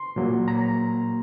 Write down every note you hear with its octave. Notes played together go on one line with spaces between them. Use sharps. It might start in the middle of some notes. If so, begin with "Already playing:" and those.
Already playing: C6
A#2 F#3 A#3
A#5